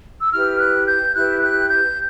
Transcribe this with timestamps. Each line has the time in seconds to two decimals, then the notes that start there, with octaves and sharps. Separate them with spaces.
0.20 E6
0.32 E4 G4 B4 F6
0.59 F#6
0.87 G6
1.15 E4 G4 B4 F#6
1.42 F#6
1.70 G6